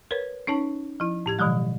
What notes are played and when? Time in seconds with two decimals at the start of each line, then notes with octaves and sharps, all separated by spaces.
0.11 A#4 B4 C#5
0.47 C#4 D#4 C#5 A5
1.00 F3 E4
1.26 A2 G4 G#6
1.39 B2 D#3 F3 F#3 G#3